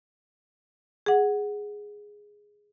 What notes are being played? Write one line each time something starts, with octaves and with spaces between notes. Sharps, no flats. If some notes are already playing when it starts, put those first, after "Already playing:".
G#4 F#5